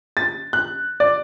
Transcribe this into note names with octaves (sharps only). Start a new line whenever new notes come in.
A6
F#6
D5